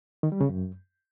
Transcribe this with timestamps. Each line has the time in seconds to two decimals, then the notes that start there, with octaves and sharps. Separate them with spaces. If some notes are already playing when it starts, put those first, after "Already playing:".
0.23 D#3
0.32 G3
0.41 C#3
0.49 F#2